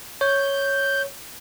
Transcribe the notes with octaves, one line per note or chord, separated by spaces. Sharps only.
C#5 G6